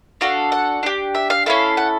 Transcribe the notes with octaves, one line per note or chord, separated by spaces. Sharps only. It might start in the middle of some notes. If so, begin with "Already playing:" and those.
D4 F#4 A4 F5
F#5
D4 G4
E5
F5
C#4 E4 A4 F5
F#5